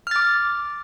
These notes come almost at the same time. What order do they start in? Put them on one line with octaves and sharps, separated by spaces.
F6 A6 D6